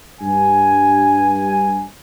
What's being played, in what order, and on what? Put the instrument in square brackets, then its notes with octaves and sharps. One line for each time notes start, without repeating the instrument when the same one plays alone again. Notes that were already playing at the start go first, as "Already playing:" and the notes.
[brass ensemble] G2 G#5